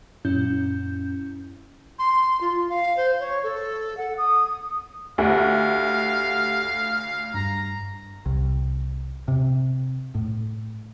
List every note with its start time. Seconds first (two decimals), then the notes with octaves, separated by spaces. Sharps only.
0.25 F#2 A#2 C#4 E4 G6
1.99 C6
2.41 F4
2.69 F5
2.97 C5
3.20 C#5
3.44 A4
3.97 F#5
4.18 D#6
5.18 D2 G4 A4 F5 F#5
7.34 G2 A#5
8.26 C2
9.28 C3
10.15 A2